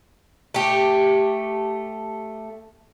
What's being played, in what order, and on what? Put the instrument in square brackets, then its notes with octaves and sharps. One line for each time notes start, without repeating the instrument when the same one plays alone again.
[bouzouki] A3 G4